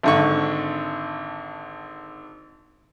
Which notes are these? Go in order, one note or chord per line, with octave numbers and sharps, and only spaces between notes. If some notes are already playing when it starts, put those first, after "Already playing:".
G#1 D3 C#6